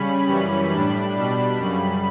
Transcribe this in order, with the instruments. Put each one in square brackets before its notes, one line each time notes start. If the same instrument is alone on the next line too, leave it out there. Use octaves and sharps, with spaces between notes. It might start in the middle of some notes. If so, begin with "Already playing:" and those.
Already playing: [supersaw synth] C#3 G3 C#4 B5
F#2 E3 G3 C#4 B5
A2 G3 D4
B2 G3 D4
F#2 C#3 G3